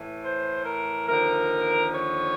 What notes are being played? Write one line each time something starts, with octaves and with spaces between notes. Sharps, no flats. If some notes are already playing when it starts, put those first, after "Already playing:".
Already playing: A2 E3
C5
A#4
D#2 D3 F3 A#4
C#5